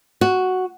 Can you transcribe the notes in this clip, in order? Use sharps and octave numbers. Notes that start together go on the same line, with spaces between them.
F#4